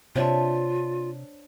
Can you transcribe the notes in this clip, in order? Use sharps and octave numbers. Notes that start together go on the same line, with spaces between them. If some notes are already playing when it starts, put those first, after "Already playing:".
C3 D4 F4 C5 C#5 E5